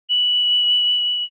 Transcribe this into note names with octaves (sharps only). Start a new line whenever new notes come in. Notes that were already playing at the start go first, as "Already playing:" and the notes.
F#7